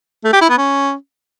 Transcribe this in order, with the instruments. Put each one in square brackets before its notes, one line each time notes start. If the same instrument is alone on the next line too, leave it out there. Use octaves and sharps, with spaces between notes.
[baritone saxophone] A3
G4
E4
B3
C#4